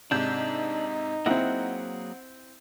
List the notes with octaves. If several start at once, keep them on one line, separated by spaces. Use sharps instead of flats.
G#2 C3 D4 D#4 G6
F#3 A#3 C4 E4 G#4 F#5